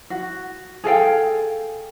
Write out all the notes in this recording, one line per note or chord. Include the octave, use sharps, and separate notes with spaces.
F#4
G#4 A4 F5 G5